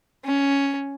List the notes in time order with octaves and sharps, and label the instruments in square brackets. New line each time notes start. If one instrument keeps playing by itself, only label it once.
[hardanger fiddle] C#4